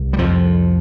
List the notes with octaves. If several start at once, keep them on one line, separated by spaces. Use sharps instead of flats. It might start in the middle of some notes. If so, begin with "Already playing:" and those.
Already playing: C2
G3
F2 F3